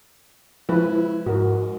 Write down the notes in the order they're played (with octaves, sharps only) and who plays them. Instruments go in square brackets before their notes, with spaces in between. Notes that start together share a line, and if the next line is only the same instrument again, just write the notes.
[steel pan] F3 G#3 B4 [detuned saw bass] E4
[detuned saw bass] G#2 [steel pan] F#4 A#4